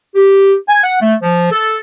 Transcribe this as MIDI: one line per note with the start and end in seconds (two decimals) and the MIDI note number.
0.15 0.54 67
0.67 0.82 80
0.84 0.98 78
1.00 1.14 57
1.22 1.49 53
1.52 1.78 69